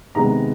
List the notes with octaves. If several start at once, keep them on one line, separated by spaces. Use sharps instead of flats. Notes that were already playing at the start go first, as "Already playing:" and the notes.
C3 D#3 G#3 B3 A#5